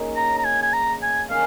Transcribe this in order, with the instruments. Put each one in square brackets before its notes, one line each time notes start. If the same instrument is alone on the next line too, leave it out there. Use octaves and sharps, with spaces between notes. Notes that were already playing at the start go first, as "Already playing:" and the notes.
Already playing: [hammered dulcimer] C#3 A#3 D#4 C#5
[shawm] A#5
A#5
G#5
G#5
A#5
G#5
[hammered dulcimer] D#3 C#4 A#4 C#5 [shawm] F5